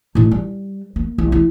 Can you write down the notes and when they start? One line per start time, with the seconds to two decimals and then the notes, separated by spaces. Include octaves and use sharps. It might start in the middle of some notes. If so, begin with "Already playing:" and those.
0.15 A2 D#4
0.31 G3
0.96 A#3
1.18 C2
1.32 E3